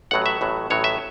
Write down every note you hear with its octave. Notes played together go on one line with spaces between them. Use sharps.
A1 A2 F#3 F#5
E5
A1 A2 F#3
A1 A2 F#3 C#5
E5